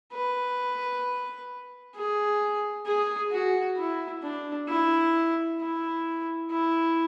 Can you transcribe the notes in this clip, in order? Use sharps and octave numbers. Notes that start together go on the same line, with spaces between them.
B4
G#4
G#4
F#4
E4
D4
E4
E4
E4